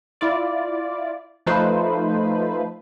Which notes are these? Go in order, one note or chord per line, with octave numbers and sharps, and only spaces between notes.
E4 F4 D5
F3 A3 D#4 F4 B4 C5